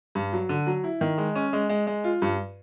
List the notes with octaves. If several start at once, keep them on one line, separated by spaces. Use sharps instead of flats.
G2
F#3
D3
F#3
E4
D#3
G#3
C#4
G#3
G#3
G#3
F4
G2